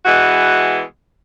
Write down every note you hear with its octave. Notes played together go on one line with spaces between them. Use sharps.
B2 E3 G#3 F#4